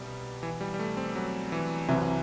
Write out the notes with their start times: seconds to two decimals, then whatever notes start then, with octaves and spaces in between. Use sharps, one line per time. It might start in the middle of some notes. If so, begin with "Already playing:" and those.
Already playing: C2 B2 G3
0.43 E3
0.61 G3
0.74 G3
0.79 A3
0.97 C4
1.15 F#3
1.52 E3
1.88 C2 C3 E3 F#3